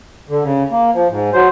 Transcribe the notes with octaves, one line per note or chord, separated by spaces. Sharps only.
D3
C#3
A#3
F3
G#2
F#3 C5